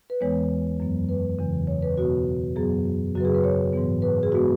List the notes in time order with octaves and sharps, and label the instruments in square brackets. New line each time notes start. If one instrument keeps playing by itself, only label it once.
[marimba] B4
E2 E3 G#3 B3 C#5
F#2 F#3 B3
B4
E2 C#3 E3
C#5
B4
B2 B3 F#4
F#2 F#3 B3 G#4
F#2 C#3 F#3 F#4 B4
G#4
B4
C#5
G#2 E3 B3
B4
G#4
G#3 B3 F#4